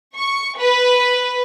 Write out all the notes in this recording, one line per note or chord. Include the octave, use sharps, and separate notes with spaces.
C#6
B4